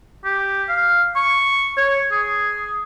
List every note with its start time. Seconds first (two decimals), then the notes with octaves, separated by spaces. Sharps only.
0.24 G4
0.69 F5
1.16 C#6
1.77 C#5
2.12 G#4